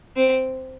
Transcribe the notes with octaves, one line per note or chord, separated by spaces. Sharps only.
C4